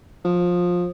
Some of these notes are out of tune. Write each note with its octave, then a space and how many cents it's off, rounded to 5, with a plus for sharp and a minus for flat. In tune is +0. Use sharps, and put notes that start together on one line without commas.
F3 +20